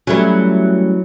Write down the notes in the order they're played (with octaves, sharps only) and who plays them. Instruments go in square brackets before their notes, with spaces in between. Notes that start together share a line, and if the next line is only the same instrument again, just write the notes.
[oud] E3 F#3 [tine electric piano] G3 A3 C#4